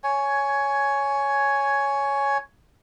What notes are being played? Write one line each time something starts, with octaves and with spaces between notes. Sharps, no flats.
C#5 G#5